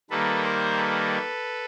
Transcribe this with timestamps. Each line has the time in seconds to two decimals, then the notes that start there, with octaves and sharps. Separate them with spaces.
0.10 D#3 G3 A#3 A4 B4
0.44 A#4 C5
0.78 A4 B4